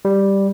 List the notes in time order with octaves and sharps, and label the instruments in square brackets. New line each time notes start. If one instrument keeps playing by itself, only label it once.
[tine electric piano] G3